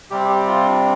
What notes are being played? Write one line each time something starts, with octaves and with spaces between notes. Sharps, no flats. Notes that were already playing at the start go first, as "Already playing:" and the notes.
C3 G3 C4 G4
G4
F4
D4